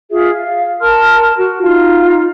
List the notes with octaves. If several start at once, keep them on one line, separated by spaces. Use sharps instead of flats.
F4 G#4 E5
F5
A#4 A5 C6 F6
F#4
D#4 F4